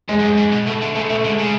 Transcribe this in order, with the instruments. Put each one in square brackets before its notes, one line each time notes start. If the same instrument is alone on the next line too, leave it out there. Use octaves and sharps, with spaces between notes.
[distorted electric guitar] F#2 [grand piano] G#3
[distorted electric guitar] G#2
F#2
G#2
B2
[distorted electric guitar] B2 [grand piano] A3
[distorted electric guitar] D3
[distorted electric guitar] C#3 [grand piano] A3
[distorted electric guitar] B2 [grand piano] A3
[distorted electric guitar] D3 [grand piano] G#3
[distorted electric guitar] C#3